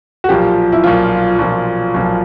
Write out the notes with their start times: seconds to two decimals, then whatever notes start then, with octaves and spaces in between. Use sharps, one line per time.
0.24 F#4
0.29 B1 A#2 F3 G4
0.72 E4
0.84 B1 A#2 F3 F4
1.39 B1 A#2 F3
1.94 B1 A#2 F3